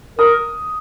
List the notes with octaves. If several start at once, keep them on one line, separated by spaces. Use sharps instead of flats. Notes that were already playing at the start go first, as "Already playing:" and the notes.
A#4 D#6